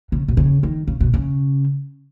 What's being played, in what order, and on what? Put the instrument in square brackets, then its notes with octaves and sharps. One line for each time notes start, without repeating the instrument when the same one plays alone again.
[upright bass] C#3
B2
C#3
D#3
C#3
B2
C#3